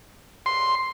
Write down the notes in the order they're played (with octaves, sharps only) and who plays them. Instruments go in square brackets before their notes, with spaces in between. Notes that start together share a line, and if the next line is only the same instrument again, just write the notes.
[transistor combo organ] C6